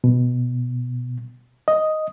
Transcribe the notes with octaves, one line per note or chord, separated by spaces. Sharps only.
B2
D#5